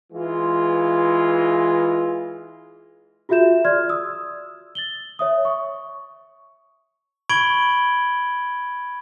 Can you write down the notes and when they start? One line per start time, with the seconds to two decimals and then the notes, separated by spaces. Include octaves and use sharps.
0.13 E3 G#3 F4
3.29 F4 F#4 G#4 E5 G6 E7
3.65 D5 C6 F6 G#6
3.89 D#6 E6
4.75 A6 F#7 G7
5.19 C#5 E5 D#6
5.45 C#6
7.29 B5 C#6 G#6 D7 F#7 G7